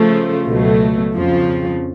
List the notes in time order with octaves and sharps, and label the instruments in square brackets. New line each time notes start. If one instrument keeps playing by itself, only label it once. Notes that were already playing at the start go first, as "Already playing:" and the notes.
Already playing: [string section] C#3 F3 A3
C#2 B2 F#3 A3
F2 C#3 F3